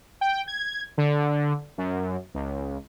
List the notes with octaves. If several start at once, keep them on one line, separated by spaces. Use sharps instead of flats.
G5
G#6
D3
F#2
C#2